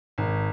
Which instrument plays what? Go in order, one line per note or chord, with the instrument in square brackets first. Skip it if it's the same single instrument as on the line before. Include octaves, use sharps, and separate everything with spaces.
[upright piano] G#1